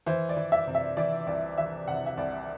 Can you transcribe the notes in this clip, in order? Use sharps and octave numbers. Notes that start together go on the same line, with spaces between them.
E3 C5
D5
E3
E5
C3
E5
E3 D5
C2 D5
E3 E5
C3 F#5
E5
C2 D5